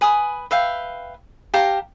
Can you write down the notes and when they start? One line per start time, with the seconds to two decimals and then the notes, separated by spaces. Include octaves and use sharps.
0.01 B4 G#5 B5 D#6
0.51 B4 E5 F5 G5
1.54 G4 F5 A5 A#5